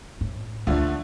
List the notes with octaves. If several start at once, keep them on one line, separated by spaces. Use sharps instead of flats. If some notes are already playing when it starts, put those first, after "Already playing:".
A2
D2 D3 F3 A3